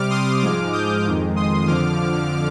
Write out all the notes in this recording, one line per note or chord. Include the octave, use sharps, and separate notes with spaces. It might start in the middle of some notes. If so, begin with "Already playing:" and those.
Already playing: C3 G3 D6 F6
C6 D#6
G#2 F3 G#3 D6 F6
D#6 G6
F2 D#3 G#3
C6 D#6
F2 D3 F3 D6 F6